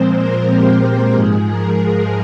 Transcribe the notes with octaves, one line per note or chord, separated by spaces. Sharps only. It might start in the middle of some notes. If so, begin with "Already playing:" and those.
Already playing: A#2 F3 G#3 C4 C5
A#4
G4
G#2 F3 G#3 G#4
A#4